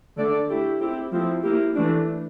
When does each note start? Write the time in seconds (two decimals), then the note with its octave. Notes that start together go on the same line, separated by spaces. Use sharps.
0.17 D3 A3 D4 A4 D5
0.48 A3 E4 G4
0.80 C4 E4 G4
1.11 F3 A3 C4 E4
1.43 A#3 E4 G4
1.74 E3 A3 D4